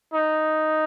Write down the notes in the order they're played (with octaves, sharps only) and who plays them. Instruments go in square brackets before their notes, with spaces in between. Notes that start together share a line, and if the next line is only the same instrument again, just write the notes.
[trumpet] D#4